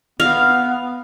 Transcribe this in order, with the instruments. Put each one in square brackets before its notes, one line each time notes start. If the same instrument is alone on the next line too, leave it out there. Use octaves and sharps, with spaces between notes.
[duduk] B3 [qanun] F5